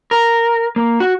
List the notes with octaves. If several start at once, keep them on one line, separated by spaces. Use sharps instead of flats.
A#4
A#3
F#4